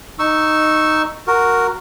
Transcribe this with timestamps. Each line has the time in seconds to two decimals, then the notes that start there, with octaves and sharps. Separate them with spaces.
0.19 D#4 C#6 E6
1.27 F#4 A#4